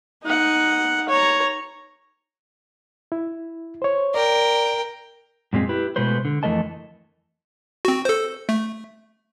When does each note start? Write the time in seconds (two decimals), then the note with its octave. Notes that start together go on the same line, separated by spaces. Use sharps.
0.23 D#4 F#5
1.09 C#5 A#5
3.12 E4
3.82 C5 C#5
4.14 A#4 D5 G5
5.53 F#2 A#2 G#3 C4
5.69 E4 G4 B4
5.96 B2 G#3 A3 B4 C5
6.25 D3
6.43 F2 E3 A3 A#4 D#5 A5
7.85 C4 F#4
8.05 A4 C5
8.49 A3